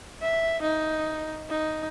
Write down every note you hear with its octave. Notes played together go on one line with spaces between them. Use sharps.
E5
D#4
D#4